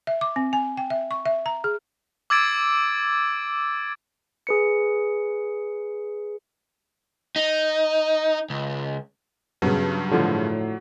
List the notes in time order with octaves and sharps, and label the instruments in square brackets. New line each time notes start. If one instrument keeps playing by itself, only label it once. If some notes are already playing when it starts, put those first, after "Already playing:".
[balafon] E5
D6
C4
G#5
G5
E5
C#6
E5
A#5
G#4
[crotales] D6 E6 G#6 A6 D7
[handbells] G#4 B4 C#7
[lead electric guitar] D#4
C#2
[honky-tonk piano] G2 C#3 [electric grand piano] F#3 [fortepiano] B3
[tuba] A2 [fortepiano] D3 F3